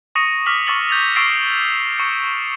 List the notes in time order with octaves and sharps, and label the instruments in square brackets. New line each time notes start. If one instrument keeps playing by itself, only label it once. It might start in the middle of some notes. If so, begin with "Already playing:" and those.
[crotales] C#6 D#6 A#6 C#7 D#7
D6 F6 B6 F#7
C#6 D6 E6 A6 C#7 F#7
G6 A6 F7
C#6 D6 E6 A6 C7 D7
C#6 C#7